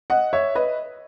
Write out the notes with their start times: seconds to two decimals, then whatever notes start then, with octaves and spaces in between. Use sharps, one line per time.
0.10 D#5 F#5
0.33 C#5 E5
0.55 B4 D#5